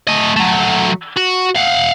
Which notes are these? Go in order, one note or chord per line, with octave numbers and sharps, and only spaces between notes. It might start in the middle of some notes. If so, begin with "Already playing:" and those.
A3 D#5
F#3 A3
F#4
F5 F#5